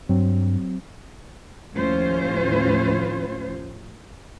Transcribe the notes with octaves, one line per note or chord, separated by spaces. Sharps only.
G2 F#3 C4
D#2 A2 F3 C#4 F4 C5